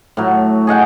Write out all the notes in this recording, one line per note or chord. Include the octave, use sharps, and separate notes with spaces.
A2 F#3
G#4 D#5 F#5 G5